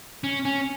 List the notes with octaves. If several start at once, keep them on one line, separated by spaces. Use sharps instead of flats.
C#4
C#4